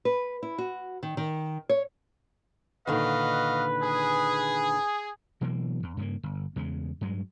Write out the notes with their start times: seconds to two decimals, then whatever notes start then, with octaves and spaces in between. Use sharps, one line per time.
0.05 B4
0.43 E4
0.58 F#4
1.03 D#3
1.17 D#3
1.69 C#5
2.87 A#2 D3 D#3 F#4 B4 D#5 F5
3.83 G#4
5.41 B2 E3 F#3 A#3
5.83 E2
5.97 G2 C#3 A#3
6.23 G1
6.56 E2 C#3 G#3
7.01 G2 F#3 G#3